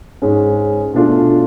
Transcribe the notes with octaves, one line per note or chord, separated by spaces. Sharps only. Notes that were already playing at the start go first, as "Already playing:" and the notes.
G#2 G#3 C#4
B2 A3 D4 F4